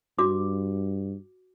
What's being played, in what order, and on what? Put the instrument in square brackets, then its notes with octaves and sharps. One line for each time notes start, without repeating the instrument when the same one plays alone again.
[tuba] G2 [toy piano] F#4 D6